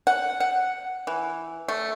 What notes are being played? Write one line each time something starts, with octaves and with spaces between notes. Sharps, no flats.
F#5
F#5
E3
A3